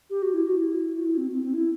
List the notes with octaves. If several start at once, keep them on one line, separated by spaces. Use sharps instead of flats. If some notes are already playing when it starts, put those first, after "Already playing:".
G4
F#4
E4
F#4
E4
F#4
E4
C4
C4
C4
E4